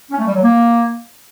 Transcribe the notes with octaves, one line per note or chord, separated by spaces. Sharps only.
C#4
A3
G3
F#3
A#3